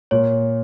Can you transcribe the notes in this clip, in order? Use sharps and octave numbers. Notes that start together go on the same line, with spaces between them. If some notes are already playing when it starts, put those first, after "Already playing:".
A#2 C#5